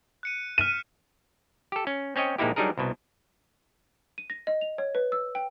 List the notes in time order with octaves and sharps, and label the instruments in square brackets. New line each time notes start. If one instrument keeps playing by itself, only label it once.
[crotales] F#6 C#7 D#7
[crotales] F6 B6 E7 [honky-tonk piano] D#7
[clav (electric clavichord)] G4 A4
C#4
C4 C#4 C#5 D#5 G5
A#1 G#3 A#3 D#4 E4 G4
F#3 G3 D4 D#4 G#4 A#4
C2 B2
[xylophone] D#7
A#6
D#5
F7
C#5
B4
E6
G5